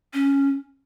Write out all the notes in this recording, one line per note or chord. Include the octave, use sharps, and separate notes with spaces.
C#4